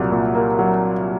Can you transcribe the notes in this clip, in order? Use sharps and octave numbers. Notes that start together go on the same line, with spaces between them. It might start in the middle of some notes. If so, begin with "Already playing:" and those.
Already playing: C2 A#2 F#3
A#2
A#3
F#3